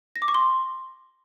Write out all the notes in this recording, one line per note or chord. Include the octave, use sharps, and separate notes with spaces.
A#6
D6
C#6
C6